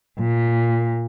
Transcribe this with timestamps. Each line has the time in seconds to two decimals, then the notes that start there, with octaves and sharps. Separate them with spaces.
0.17 A#2